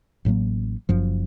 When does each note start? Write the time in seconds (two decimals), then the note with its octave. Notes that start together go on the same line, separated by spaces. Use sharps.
0.25 A1 A2 F#3 A#3
0.89 F#1 F#2 F3